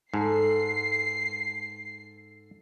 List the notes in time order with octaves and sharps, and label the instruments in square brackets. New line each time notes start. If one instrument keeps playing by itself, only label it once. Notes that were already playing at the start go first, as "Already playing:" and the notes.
[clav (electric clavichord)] G#2 [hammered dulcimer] A4 [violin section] C7